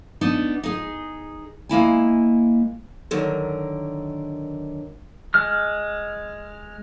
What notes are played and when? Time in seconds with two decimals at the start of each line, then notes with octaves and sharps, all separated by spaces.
0.21 B3 D4 D#4
0.63 D#4 G#4
1.69 G#3 A#3 E4 G#5
3.11 D3 D#3 F#3 A#4
5.34 G#3 F6